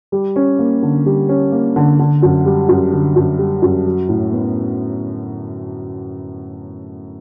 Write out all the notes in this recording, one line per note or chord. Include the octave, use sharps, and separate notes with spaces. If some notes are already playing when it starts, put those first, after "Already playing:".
G3
C#4
A#3
D3
G3
C#4
A#3
D3
D3
F#2
G3
F#2
D3
F#2
G3
F#2
F#3
A2
B3